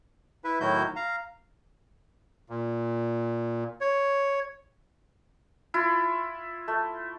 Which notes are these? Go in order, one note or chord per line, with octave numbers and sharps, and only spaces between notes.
E4 B4 E5
A2 D#3 F#3 E4 F#4 G6
F5 A#5
A#2
C#5
E4 F4
A3